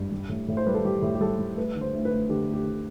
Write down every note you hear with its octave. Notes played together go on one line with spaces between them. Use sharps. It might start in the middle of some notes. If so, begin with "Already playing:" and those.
Already playing: G2
G3
A2
A2
C5
G3 B4
A4
G3 G4
A2
G4
G3 A4
G3
A3 B4
D3
C5
D2
B4
D2
D3 G4
A3
G4
D3